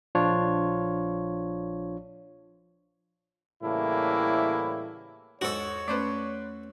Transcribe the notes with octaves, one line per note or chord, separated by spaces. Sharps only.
A#1 F3 D4 F4 C#5
A2 C#3 E3 G3 A#3 E4
E2 G#2 F#4 A4 C#5
A3 C#4 B4 C5 D5